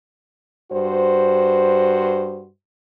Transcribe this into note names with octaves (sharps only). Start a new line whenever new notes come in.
G2 F#4 C5